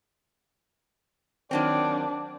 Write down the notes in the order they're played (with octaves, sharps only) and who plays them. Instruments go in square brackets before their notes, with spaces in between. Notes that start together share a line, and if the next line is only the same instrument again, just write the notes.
[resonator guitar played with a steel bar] D#3 F#3 C4 [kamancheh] D4